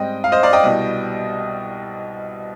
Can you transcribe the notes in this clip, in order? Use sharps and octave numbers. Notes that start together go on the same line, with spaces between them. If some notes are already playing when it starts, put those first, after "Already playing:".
Already playing: G#2 G3 C4 D#5 G5
F5
C5 D#5
D5 F5
D#5 G5
C2 B2 G3